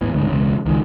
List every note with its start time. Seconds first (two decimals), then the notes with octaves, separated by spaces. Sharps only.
0.01 E2 A2 E3
0.14 D2 G#2
0.26 E1 C#2 C#3
0.66 C#2 D#3 G#3